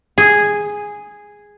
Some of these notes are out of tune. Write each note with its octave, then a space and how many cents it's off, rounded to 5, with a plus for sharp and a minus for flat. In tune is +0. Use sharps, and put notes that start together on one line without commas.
G#4 -5